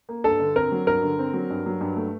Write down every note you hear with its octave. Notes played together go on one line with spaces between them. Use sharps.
A#3
G2 A4
D3
C4 A#4
F#3
G2 A#4
D3
C4
F#3
G2
F#3
G2
A3